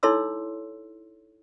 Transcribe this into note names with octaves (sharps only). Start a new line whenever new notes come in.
D#4 E4 A4 C#5 C6 E6